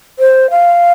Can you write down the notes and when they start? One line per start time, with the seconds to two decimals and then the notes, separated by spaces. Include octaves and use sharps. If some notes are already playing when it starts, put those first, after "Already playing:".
0.19 C5
0.50 F5